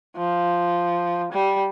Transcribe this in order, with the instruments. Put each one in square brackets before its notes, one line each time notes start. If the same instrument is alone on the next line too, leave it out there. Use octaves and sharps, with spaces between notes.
[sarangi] F3
G3